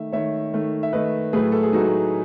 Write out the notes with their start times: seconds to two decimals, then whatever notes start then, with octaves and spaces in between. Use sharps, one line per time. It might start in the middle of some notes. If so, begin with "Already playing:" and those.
Already playing: D#3 A3 E5
0.12 D#3 A3 C#5 E5
0.54 D#3 A3
0.83 E5
0.93 D#3 A3 B4 D#5
1.33 A2 F#3 A3 G#4 B4
1.52 A4
1.63 G#4
1.73 A2 F#3 A3 D#4 F#4